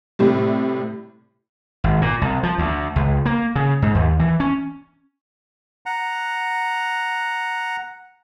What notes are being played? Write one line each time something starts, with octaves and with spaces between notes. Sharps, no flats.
A2 C3 G3
G#1
A#2
C2
F3
D2
C#2
A#3
C#3
G#2
D#2
E3
C#4
F#5 A#5